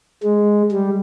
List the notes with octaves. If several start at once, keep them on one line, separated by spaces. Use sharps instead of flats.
G#3
G3